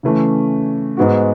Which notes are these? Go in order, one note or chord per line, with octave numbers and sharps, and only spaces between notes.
C#3 E3 A3 C#4
G#2 G#3 B3 F#4